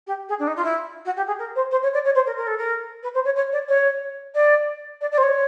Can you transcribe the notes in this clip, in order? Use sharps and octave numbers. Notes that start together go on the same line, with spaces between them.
G4
G#4
D4
D#4
F4
E4
F#4
G4
G#4
A#4
C5
C5
C#5
D5
C#5
C5
A#4
A#4
A4
A#4
B4
C5
C#5
C#5
D5
C#5
D5
D5
D5
C5
C#5